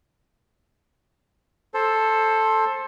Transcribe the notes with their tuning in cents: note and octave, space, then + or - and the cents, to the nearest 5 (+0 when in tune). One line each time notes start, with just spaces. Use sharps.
A4 +0 C5 +20